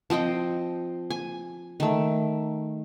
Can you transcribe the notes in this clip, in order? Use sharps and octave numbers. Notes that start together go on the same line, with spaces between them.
F3 C4 D#5 G5
G#5
D#3 A3